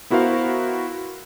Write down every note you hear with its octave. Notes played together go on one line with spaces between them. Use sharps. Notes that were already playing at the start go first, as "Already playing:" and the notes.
B3 E4 F#4 A#4 C5 F5